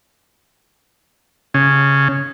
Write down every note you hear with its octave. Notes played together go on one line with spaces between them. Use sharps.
C#3